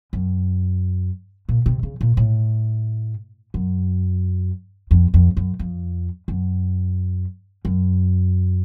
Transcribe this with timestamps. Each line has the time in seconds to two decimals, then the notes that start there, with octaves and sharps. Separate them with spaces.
0.13 F#2
1.49 A#2
1.66 C3
1.83 C#3
2.01 A#2
2.17 A2
3.54 F#2
4.91 F2
5.14 F2
5.37 F#2
5.59 F2
6.28 F#2
7.65 F#2